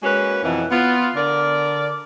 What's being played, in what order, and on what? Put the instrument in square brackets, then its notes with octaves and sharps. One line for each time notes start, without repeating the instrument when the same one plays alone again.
[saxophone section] G#3 A#3 C#4 F#4 B4
F2 B2 E3
B3 F4
D3 A#4 D5